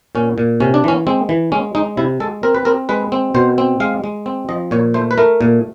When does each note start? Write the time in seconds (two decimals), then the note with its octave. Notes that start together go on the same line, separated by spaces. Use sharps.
0.15 A#2 C#4
0.38 A#2
0.60 C3 C#4
0.74 D4
0.84 E3 C#4
1.07 G#3 C4
1.29 E3
1.52 G#3 C#4
1.75 G#3 D#4
1.97 C3 E4
2.20 G#3 A4
2.43 C4 A#4
2.55 B4
2.65 C4 A#4
2.89 G#3 B4
3.12 C4
3.34 B2 C5
3.58 C4
3.80 G#3 F5
4.04 G#3
4.26 C4
4.49 F3 D#5
4.71 A#2 C#5
4.94 A3 C5
5.11 B4
5.18 A3 A#4
5.41 A#2